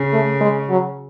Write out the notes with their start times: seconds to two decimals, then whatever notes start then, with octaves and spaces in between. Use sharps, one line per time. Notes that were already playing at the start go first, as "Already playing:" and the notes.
Already playing: C#3
0.13 A3
0.41 G#3
0.70 F#3